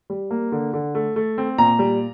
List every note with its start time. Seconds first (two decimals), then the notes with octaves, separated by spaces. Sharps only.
0.10 G3
0.31 A#3
0.52 D3
0.73 D3
0.95 A3
1.16 A3
1.38 C4
1.58 A#2 A#5
1.79 G3